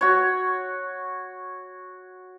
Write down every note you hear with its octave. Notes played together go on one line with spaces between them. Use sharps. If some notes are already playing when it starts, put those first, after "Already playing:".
F#4 C#5